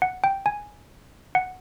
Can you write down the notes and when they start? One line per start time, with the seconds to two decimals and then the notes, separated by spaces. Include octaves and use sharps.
0.02 F#5
0.24 G5
0.46 G#5
1.35 F#5